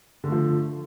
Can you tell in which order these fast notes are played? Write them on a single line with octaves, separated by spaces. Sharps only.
D3 A3 F3